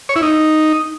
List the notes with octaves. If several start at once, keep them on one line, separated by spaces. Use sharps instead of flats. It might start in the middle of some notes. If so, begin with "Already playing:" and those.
C#5
E4
D#4